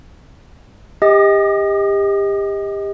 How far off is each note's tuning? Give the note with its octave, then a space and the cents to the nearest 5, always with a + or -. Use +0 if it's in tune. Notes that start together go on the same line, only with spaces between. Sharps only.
G4 +30 D#5 +20 D#6 -35